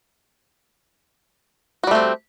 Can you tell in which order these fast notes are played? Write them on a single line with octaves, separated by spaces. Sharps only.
F#4 G3 A3 C4